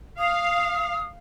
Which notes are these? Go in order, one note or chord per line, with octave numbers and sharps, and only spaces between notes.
F5 D#6